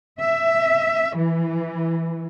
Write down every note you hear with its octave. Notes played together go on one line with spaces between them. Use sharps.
E5
E3